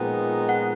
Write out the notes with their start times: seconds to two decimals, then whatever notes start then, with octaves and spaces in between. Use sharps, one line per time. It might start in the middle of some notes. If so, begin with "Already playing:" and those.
Already playing: A#2 F3 G#3 B3 D#4 G5
0.49 F#5